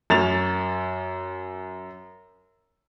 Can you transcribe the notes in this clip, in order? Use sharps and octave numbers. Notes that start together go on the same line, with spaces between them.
F#2 A6 F7